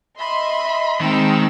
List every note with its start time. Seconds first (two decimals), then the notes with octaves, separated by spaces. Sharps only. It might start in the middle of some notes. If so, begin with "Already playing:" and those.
0.19 D#5 E5 B5 C6
1.01 D#3 G#3 C4 G5 A5 E6